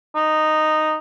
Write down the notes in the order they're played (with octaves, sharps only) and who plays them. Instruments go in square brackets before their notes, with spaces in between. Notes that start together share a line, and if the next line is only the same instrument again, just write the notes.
[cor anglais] D#4